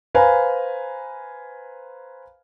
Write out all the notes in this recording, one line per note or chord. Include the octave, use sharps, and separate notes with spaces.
B4 C5 F5 G#5 A#5 B5